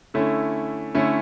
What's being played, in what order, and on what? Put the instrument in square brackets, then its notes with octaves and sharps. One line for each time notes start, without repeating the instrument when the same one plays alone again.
[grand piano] D3 A3 C#4 E4
D3 A3 C#4 E4